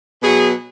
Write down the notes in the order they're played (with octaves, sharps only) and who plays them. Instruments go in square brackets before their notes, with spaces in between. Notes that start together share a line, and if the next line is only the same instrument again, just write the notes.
[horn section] B2 F#3 G#4